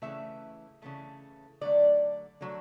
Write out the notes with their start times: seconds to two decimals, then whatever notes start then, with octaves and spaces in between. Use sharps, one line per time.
0.02 C#3 E3 A3 E5
0.82 C#3 E3 A3
1.61 D3 F#3 A3 D5
2.41 D3 F#3 A3